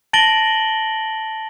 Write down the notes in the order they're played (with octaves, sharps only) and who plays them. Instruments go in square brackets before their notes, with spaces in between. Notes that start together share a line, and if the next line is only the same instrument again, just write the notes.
[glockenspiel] A5 A6 A#6 D7 F#7 G7